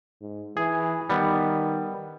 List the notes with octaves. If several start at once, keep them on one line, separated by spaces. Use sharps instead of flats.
G#2
E3 G#4
D#3 G3 B3